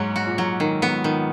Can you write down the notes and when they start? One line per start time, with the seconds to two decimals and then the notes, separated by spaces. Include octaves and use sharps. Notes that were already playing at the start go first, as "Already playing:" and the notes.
Already playing: G#2 F#3
0.16 F#4
0.27 A#2
0.38 F#3
0.60 D#3
0.82 B3
1.04 D#3